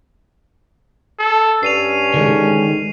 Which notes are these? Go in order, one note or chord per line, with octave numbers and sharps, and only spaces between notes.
A4
G2 C#4 C7 D#7 F7
D3 D#3 G#3